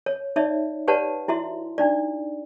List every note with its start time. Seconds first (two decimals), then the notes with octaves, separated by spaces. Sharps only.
0.06 C#5
0.36 D#4 C#5 D5 E5
0.88 G4 B4 C#5 D5 F#5 A5
1.28 E4 F#4 E5 C6
1.78 D4 D#4 D5